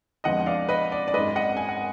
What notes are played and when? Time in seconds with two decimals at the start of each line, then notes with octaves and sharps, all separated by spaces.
0.24 F2 F3 G#3 B3 D4 D#5 F#5
0.46 D5 F5
0.69 B4 D#5
0.92 D5
1.08 D5
1.13 G#1 F#2 D#3 G#3 B4 D#5
1.36 D#5 F#5
1.57 G#5
1.69 F#5